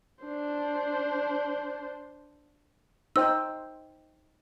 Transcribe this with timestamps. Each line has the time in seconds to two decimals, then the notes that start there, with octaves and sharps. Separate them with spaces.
0.25 D4 C5
3.16 D#4 C5 G5 E6